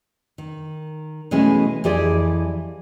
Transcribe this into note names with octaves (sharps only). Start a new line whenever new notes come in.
D#3
B2 E3 G#3 A3 C#4
F2 E3 G4 G#4 D5